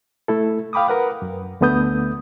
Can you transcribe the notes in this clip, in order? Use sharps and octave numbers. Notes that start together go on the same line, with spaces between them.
A3 E4 A4
F5 G5 B5 D6 D#6
A#4 B4 F#5
F#2
D2 D3 A3 B3 D#6 G6